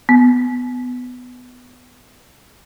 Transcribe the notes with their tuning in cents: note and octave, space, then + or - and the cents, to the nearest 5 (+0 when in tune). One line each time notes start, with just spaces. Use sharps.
B3 +15